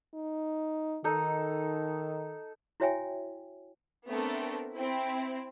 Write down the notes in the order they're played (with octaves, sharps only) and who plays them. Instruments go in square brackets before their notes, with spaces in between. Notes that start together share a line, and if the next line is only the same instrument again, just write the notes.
[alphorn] D#4
[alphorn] D#3 [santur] D#4 A4
[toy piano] E4 F#4 C#5 E5 G5 G#5
[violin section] A3 B3 C4 D4 A4 A#4
C4 E4